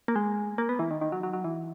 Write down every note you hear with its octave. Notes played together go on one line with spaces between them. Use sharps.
A#3
G#3
A#3
B3
E3
D#3
D#3
F#3
F#3
F#3
E3